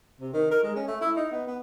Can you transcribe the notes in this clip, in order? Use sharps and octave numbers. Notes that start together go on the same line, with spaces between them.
C3
D#3
A#4
G#3
C#4
A3
E4
D#4
B3
B3